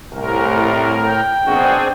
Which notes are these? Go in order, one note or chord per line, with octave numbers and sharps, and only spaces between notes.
C2 A2 A#4
G5
A#1 B2 C4 D4 F#4 G#4